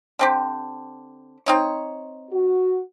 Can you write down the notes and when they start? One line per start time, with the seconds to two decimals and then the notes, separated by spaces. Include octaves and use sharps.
0.19 D3 C4 G4
1.46 C4 D#4 C#5
2.31 F#4